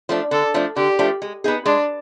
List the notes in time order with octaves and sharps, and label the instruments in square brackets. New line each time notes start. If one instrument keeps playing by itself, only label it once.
[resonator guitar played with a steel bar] F3 A3 D4
[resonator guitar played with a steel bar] D3 [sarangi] A4
[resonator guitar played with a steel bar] F3 A3 D4
[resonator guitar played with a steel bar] D3 [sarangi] G4
[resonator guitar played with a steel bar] F3 A3 D4
G#3
B3 D#4 G#4
[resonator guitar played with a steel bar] G#3 [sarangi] D4